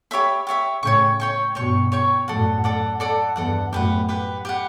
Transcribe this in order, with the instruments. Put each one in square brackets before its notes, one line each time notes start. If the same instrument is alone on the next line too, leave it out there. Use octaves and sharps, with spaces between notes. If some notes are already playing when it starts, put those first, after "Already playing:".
[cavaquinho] G4 C#5 E5 B5
G4 C#5 E5 B5
[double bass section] A2 C#3 [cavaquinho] C#5 G5 C#6
[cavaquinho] C#5 G5 C#6
[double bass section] G2 B2 [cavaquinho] C#5 G5 C#6
[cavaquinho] C#5 G5 C#6
[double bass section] F#2 A2 [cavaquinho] A4 D5 F#5
[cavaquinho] A4 D5 F#5
A4 D5 F#5
[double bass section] E2 G2 [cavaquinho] A4 D5 F#5
[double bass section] F#2 A2 [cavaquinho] G4 B4 F#5
[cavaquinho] G4 B4 F#5
G4 B4 F#5